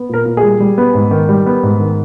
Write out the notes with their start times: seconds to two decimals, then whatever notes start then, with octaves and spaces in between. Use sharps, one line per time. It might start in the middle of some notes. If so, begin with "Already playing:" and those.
Already playing: B3
0.09 A#2 A#4
0.25 A#2
0.37 G#4
0.43 G3
0.60 G3
0.78 B3
0.95 G#2
1.11 D#3
1.29 G3
1.46 B3
1.63 G#2
1.80 D#3